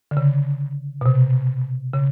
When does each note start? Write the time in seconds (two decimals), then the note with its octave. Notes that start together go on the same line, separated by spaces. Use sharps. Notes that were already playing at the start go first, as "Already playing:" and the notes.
0.11 D3
0.17 C#3
1.01 B2
1.06 C3
1.94 C#3